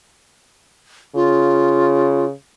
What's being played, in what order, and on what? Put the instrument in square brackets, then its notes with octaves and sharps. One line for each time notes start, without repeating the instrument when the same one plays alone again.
[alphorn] C#3 [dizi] F4